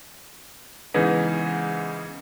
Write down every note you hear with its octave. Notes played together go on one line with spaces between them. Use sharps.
G#2 C#3 E3 B3 D#4